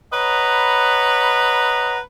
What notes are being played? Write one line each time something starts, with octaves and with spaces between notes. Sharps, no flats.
B4 C#5 D#5 F#5 A#5 B5